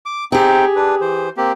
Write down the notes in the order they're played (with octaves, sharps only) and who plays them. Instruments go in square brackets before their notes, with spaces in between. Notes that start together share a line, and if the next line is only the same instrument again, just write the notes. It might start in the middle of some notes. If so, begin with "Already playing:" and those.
[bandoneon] D6
[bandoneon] C4 D#4 G5 [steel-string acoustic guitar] G4 G#4
[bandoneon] D4 B4
E3 C5
A#3 C4 G4